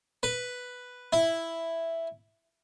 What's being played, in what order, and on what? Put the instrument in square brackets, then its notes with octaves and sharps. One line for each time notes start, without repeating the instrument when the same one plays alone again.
[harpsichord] B4
E4